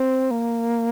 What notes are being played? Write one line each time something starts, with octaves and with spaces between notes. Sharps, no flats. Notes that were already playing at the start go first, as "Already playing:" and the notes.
Already playing: C4
A#3